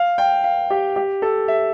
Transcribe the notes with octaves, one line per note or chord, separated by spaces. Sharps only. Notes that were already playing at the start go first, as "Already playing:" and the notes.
Already playing: F5
G5
F5
G4
G4
A4
E5